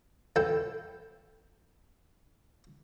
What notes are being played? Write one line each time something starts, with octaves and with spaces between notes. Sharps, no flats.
E2 A4 G5